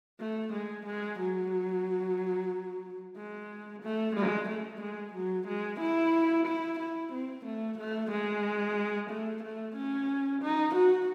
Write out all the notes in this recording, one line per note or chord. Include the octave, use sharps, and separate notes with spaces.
A3
G#3
G#3
F#3
G#3
A3
G#3
A3
G#3
F#3
G#3
E4
E4
E4
C4
A3
A3
G#3
A3
A3
C#4
D#4
F#4